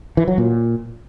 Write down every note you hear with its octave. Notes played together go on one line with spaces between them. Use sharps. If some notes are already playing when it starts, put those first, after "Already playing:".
E3
F#3
A#2